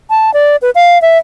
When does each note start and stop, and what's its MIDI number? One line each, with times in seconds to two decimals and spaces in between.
0.10 0.33 81
0.34 0.56 74
0.62 0.70 71
0.75 1.01 77
1.02 1.18 76